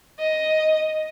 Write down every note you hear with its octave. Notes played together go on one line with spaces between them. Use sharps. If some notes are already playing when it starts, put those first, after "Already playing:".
D#5